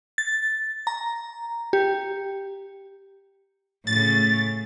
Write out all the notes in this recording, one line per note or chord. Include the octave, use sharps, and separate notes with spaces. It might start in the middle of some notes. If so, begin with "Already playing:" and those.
A6
A#5
G4
A2 C#3 A6